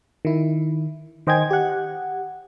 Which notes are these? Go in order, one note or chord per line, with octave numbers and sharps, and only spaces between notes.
D#3 E4
D#3 C5 D#5 G5 G#5 G#6
G4 F#5